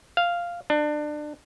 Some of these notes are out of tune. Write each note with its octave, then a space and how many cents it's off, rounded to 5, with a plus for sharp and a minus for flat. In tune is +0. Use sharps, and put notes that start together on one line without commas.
F5 -5
D4 +25